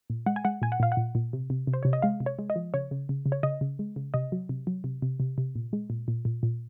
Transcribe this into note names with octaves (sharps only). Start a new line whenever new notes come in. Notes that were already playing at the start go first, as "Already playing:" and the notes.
A#2
G#3 F#5
G#5
G#3 F#5
A#2 G#5
F#5
A#2 F5
F#5
A#2
A#2
C3
C3
C3
C5
C3 C#5
D#5
G#3 F5
C3
C#5
G#3
D#5
F3
C#3 C#5
C#3
C#3
C#3
C#5
C#3 D#5
C#3
G#3
C#3
C3 D#5
F#3
C3
F#3
C3
C3
C3
C3
A#2
G#3
A#2
A#2
A#2
A#2